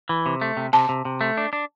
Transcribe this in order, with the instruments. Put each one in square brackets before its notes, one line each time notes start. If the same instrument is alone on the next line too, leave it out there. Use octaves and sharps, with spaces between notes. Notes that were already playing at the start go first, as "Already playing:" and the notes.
[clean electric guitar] E3
C3
A3
C3
[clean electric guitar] C3 [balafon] A5
[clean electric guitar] C3
C3
A3
D4
D4